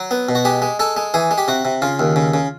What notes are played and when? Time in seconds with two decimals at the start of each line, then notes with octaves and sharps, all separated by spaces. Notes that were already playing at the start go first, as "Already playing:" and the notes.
Already playing: F#3
0.11 B3
0.29 B2
0.35 F#4
0.45 G#3 G4
0.62 G#3
0.79 G#3 A4
0.97 G#3
1.14 E3 G#4
1.31 G#3
1.38 G4
1.48 C3 F#4
1.65 C3
1.82 C#3 F4
1.99 D#2
2.16 C#3
2.34 C#3